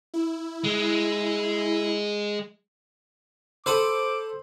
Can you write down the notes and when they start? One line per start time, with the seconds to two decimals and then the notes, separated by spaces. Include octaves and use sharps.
0.14 E4
0.64 G#3
3.66 A4 C5 B5 D6 D#6